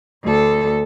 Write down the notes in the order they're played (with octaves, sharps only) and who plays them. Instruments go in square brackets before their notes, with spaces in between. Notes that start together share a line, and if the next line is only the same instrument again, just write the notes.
[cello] D2 A4